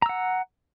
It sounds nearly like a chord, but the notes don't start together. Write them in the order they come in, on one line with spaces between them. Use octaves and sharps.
A#5 E6 F#5